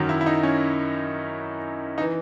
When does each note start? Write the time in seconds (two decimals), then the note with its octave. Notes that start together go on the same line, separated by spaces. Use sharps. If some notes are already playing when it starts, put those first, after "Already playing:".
Already playing: F#2 D#3 F#3
0.09 E4
0.21 E4
0.26 D#4
0.43 C#4
1.98 D#4
2.00 E3